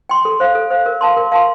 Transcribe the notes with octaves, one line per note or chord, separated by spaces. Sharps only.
G5 C6
A4
C5 F5
A4
C5 F5
A#4
F5 A5 C6
A#4
F5 A5 C6